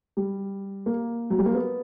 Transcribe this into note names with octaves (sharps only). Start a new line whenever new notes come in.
G3
A#3
F#3
G3
A#3
B3